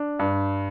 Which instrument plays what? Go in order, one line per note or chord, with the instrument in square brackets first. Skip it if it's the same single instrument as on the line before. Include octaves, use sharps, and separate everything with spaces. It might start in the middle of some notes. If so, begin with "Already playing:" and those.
Already playing: [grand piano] D4
G2